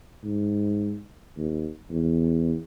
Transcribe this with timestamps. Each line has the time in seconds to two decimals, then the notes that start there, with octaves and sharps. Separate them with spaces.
0.24 G#2
1.38 D#2
1.91 E2